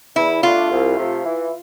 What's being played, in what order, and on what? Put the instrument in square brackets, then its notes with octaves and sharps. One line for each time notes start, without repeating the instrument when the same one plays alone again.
[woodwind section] E2 [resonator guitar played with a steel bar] E4
[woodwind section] D3 A3 D4 [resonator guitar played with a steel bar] F4
[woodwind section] C2
C3 F3 A3
E3